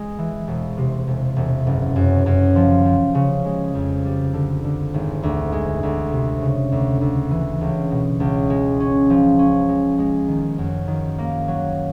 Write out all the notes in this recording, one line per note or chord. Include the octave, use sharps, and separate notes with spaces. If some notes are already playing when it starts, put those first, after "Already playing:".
Already playing: G#3
E3
E1
C3
E1
E1
F#1
F#2
F#2
F3
F3
C#3
G#3
F2
G3
D3
D3
G#1
D2
G#3
D2
C3
C#3
D2
D2
E3
C#2
B2
C#2
G#3
C#4
F3
C#4
G#3
G#3
D#3
F#2
D#3
A#3
F#3